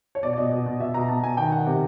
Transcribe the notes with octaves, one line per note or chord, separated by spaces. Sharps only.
C#5
B2 D5
D5
B2 D#5
B2
B2
B2 E5
B2 A#5
B2 A5
B2 G#5
D#3 G5
D#3 F#5
C3